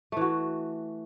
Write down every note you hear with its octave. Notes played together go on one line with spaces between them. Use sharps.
E3 A3 F#4